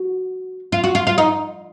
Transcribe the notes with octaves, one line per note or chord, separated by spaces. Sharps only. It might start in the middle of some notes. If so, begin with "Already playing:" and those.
Already playing: F#4
F4
F#4
F4
F4
D#4